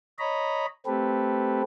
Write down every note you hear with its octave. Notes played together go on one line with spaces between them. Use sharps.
C#5 D#5 A#5 B5
A3 C4 G4 A4 B4